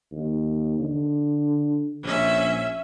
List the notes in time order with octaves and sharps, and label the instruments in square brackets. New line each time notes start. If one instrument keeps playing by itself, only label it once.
[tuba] D#2
D3
[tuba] A#1 [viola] C#4 E5